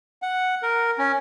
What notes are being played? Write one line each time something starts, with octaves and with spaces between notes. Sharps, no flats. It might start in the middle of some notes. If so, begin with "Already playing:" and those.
F#5
A#4
C#4